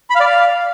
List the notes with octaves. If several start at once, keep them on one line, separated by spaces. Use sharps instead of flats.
B5
F5
D5
F5